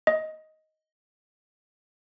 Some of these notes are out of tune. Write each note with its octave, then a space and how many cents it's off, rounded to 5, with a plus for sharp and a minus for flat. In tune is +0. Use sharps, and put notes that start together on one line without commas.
D#5 +10